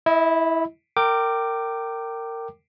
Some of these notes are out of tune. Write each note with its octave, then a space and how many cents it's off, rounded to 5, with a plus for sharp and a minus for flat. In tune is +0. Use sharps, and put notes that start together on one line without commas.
E4 -5 D#5 +40
A#4 -25 G5 -15 D6 +10